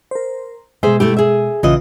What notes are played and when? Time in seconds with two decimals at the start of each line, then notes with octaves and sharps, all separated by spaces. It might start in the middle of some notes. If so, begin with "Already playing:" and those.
0.11 A#4 C5
0.83 B2 G#3 G#4 C5 E5
1.00 A3 E4 G4
1.17 G#4 E5
1.63 A#1 C#3 E3 F4 D#5